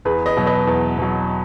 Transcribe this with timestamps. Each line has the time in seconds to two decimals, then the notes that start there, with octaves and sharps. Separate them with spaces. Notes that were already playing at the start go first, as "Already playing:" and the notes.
0.05 E2 G#4 B4
0.26 B4 D#5
0.37 B2 F#3
0.46 B4 D#5
0.67 E2
0.98 B2 F#3